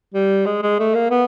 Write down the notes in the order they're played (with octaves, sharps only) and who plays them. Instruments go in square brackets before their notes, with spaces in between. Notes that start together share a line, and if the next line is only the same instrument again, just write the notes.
[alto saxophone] G3
G#3
G#3
A3
A#3
B3